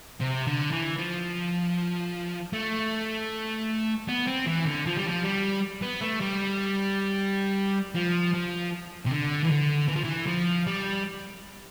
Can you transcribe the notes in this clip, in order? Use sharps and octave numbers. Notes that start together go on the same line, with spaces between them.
C3
D3
E3
F3
A3
B3
C4
E3
D3
F3
G3
F3
G3
B3
A3
G3
F3
F3
C3
D3
E3
D3
E3
F3
E3
F3
G3